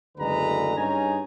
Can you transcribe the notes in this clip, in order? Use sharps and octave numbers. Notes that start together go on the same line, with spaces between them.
F#1 D2 D3 G#3 B4 A#5
G2 C#4 D#4 G#4 G#5 A#5